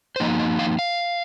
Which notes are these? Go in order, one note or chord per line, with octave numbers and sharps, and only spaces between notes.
C5
F3 A#3 D#4 D#5
D#5
F5
F5